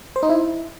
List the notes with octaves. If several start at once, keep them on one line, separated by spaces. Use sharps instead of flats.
C5
D#4
E4